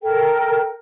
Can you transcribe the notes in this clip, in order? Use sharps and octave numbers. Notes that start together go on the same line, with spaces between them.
A4 A#4 G5